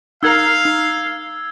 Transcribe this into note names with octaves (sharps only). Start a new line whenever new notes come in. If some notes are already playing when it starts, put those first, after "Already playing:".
D#4 A#4 F5 A#5 E6 G#6
D#4